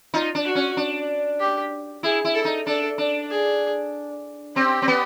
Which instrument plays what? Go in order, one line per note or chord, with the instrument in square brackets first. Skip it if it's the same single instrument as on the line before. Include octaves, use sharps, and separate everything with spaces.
[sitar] D#4 [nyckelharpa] F4
[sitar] D4
[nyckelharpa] F#4
[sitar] C#4
D4
[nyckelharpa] G4
[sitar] E4 [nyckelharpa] G#4
[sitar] E4
[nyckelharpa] A4
[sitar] D#4
[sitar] D4 [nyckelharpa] A4
[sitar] D4
[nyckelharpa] G#4
[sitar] C4 [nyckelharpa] G4
[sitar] C4
B3